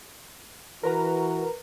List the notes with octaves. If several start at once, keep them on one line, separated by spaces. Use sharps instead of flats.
E3 F#4 A#4 B4 A#5